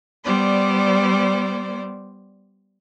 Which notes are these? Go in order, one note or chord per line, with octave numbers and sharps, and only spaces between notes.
G3 B3 C5 D5